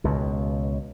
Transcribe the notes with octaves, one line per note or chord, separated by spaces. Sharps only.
C#2 B2